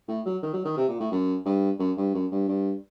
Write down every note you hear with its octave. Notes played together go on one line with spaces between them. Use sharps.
A2
F#3
D#3
F#3
D#3
C3
A#2
A2
F#2
G2
F#2
G2
F#2
G2
G2